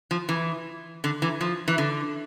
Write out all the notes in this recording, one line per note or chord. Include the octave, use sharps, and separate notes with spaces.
F3
E3
D3
E3
F3
E3
D3